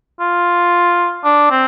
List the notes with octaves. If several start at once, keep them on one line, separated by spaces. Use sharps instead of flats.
F4
D4
C4